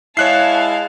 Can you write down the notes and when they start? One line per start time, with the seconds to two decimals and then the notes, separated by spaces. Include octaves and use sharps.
0.17 G#3 E4 C#5 F5 A5 F#6 C7